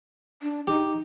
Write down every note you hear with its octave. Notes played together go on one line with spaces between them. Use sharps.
D4
D#4 G4